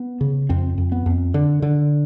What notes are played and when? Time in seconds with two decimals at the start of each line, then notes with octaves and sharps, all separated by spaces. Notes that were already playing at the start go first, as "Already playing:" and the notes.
Already playing: B3
0.21 C#3
0.49 F2 C4
0.78 F2
0.92 B3
1.06 F2
1.34 D3
1.62 D3